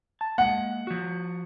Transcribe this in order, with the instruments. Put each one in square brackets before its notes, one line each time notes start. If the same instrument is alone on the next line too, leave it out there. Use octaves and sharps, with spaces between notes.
[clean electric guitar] A5
[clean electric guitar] G#3 A#3 [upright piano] F#5
[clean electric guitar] F3 F#4